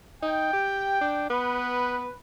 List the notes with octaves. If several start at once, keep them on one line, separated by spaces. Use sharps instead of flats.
D#4 G5
G4
D4
B3 B4